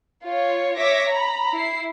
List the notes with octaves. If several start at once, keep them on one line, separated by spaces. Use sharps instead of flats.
F4 C#5
C#5 E5 D6 A#6 B6
A#5 B5
E4 C7